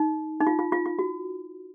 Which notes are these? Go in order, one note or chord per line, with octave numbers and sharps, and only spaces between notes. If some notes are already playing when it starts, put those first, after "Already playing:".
Already playing: D#4
D#4
F4
F4
F4
F4
F#4